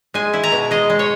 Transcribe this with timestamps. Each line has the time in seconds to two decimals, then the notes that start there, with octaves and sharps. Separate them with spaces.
0.14 G#3 G#5
0.34 E4
0.44 A#5
0.52 B2
0.71 G#3 D#5
0.90 G#3
0.99 C#5